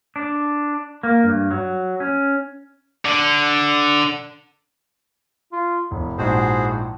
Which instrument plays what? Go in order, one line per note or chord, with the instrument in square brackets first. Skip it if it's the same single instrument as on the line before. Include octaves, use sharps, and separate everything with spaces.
[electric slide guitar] D4
A#3
G2
F#3
C#4
[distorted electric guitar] D3
[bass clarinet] F4
[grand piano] E1 [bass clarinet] E4
[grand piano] A#1 G#2 F3 [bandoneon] F#4 G#4 C5